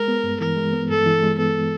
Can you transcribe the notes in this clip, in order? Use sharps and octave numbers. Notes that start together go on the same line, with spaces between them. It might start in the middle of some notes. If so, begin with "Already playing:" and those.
Already playing: G#3 A#4
B3
G2
E3 A#4
G#3
B3
G2 A4
E3
G#3
B3 A4